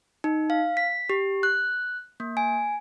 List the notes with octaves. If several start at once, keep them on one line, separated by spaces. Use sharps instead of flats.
D#4
F5
B6
G4
F#6
A#3
G#5